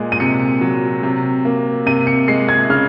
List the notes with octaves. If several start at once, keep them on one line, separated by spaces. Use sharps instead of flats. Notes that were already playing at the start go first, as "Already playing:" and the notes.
Already playing: A#2 G#3
D#7
C3 C#7
F#3
C3
A#3
C3 D#7
C#7
G#3 C7
G#6
C#3 F6